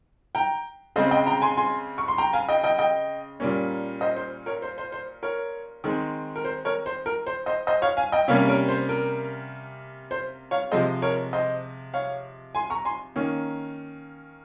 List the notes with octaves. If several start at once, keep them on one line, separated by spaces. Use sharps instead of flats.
G5 A#5
C#3 G#3 C4 C5 D#5
D#5 G5
G5 A#5
G#5 C6
G#5 C6
C#6
C6
G5 A#5
F5 G#5
D#5 G5
D#5 G5
D#5 G5
A#2 G3 A#3 C#4
C5 D#5
C5
A#4 C#5
C5
C5
C5
A#4 C#5
D#3 G#3 C4
A#4
C5
A#4 C#5
C5
A#4
C5
C5 D#5
C5 D#5
C#5 F5
F5 G#5
D#5 G5
C3 G3 A#3 C#4 C#5 F5
A#4 C#5
C5
A#4
C5
C#5 F5
C3 F3 G#3 C5 D#5
A#4 C#5
C5 D#5
C#5 F5
G#5 C6
A#5 C#6
G#5 C6
D#3 A#3 C#4